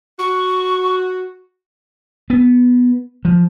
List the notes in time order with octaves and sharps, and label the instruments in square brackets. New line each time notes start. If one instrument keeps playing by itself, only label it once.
[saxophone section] F#4 [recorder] C#6
[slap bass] B3
F3